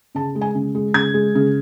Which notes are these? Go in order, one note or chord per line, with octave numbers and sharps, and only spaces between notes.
C#3 A5
G#3
G#5
C#3
G#3
C#3 G#6
G#3
C#3